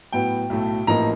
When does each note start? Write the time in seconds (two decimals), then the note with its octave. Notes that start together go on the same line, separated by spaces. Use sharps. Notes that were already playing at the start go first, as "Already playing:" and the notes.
0.12 A2 F#3 B3 G5
0.50 B1 A2 F#3 A3
0.87 A1 A2 F3 A#3 D#4 A#5